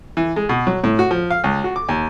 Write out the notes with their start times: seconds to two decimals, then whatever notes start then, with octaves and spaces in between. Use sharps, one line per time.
0.17 E3
0.36 G#3
0.49 B2
0.67 F#3
0.84 A2
0.99 F#4
1.11 F3
1.30 F5
1.44 C#2
1.64 F#4
1.76 D6
1.89 D#2